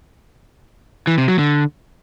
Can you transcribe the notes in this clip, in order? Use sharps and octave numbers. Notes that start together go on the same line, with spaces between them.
E3
C3
F#3
D3